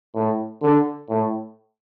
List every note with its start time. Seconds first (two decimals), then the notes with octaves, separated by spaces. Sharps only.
0.15 A2
0.62 D3
1.10 A2